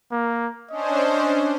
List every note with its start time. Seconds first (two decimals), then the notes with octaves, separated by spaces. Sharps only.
0.12 A#3
0.70 C#4 D4 C5 D#5